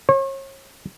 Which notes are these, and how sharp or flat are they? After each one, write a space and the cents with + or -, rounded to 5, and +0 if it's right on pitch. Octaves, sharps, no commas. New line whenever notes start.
C#5 -40